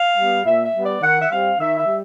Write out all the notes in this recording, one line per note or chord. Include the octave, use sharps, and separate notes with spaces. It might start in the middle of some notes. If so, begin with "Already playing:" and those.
Already playing: F5
G3 B3
A#2 E5
E5
G3 B3
D5
D#3 F#5
E5
G3 C4 F5
D#3 E5
E5
G3